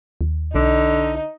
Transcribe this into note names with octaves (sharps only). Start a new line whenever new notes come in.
D#2
B1 D3 D#4